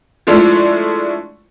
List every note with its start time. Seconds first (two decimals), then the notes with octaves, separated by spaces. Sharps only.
0.27 F3 G#3 A3 D4 E4